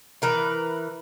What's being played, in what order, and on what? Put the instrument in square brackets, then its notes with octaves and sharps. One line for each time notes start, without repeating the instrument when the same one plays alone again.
[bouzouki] E3 A#4 B4